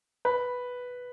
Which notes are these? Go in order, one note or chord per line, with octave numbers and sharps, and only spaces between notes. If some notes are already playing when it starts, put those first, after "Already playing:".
B4